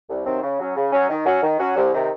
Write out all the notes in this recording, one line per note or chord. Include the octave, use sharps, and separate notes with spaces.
C2
C3 D#3 F#3 C4
C#3
F#3 C#4
C#3
F#3 C#4
D#3
F#3 C#4 F#4
D#3
F#3 C#4 F#4
C2
C3 D#3